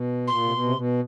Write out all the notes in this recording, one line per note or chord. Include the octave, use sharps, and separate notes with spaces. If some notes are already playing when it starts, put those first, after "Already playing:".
Already playing: B2
A#2 C6
C3
B2
C3
B2